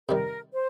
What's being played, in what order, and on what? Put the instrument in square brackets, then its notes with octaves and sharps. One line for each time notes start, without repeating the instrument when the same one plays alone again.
[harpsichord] C3 D#3 G3 [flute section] A#4
[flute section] C5